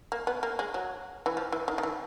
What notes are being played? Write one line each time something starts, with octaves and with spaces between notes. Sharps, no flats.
A#3
B3
A#3
G#3
F#3
E3
F3
E3
D#3
D#3
E3